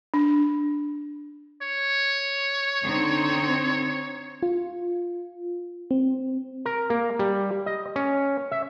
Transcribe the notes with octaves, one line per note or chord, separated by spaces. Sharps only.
D4
C#5
D3 C4 D#4
F4
C4
A#4
A#3
G3
D#5
C#4
E5